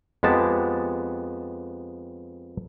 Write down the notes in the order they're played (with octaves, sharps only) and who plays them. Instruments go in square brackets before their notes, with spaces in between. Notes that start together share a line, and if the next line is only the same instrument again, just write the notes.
[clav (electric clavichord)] F2 G#3 B3 G4 A5